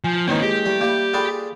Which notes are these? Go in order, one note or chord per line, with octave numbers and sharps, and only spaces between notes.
F3 G#5
D#3 A#3 C4 C#4 D#4 E4 B4
G#3 G4
G3 A3
G3 A#3 E4 F5 D6
F4 G#4 A4 D5 G5 B5